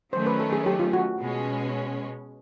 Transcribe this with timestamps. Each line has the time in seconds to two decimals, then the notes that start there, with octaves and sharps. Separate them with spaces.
0.13 D#3 F#3 A3 C#4 C5
0.26 B4
0.40 A4
0.53 G#4
0.66 G4
0.80 F4
0.93 F#4
1.19 B2 G#3 C#4